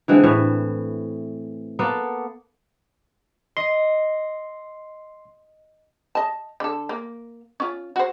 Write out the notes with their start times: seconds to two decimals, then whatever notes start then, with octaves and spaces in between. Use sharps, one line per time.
0.08 D3 E3 G#3 C4
0.23 A2 E3 E5
1.79 A#3 B3 A4
3.57 D#5 C6
6.15 D#5 A5
6.60 D3 A4
6.89 A#3
7.60 C#4 F4
7.96 F#4 C5